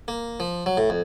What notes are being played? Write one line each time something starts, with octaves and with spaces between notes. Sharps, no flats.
A#3
F3
F#3
A2
F2